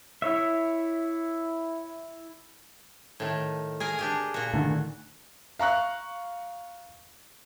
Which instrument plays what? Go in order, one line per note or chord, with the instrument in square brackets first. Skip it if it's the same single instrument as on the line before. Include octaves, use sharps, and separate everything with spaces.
[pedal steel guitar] E4 C#5 E5
[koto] A2 D#3
G#4 A#4 G#5
D4 G4 G#4
A#2 F#4
[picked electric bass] A2 D3 D#3
[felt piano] F5 A#5 C#6 F#6